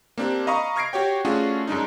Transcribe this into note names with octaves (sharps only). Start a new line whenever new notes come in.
A#3 C4 D4 G4
D#5 F5 A#5 B5 C#6 D#6
C#6 F6 G#6 A#6 C7 D7
F#4 G4 C#5 G5
A3 C#4 D4 F4 F#4 G#4
F#2 G#3 D4 D#4